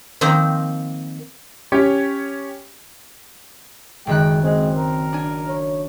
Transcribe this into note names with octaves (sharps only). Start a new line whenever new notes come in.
D#3 F3 A#3 C4 D#4
C#4 G4 C#5
F#1 D#3 G#3 G5 F#6
G#3 C4
A#4
D4 G#5
C#5